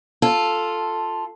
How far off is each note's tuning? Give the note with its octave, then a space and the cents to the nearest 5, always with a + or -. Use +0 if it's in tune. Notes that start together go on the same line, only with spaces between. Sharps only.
F4 +0 A4 +0